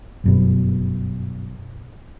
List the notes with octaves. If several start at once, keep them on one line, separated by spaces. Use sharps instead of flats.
G1 F#2 B2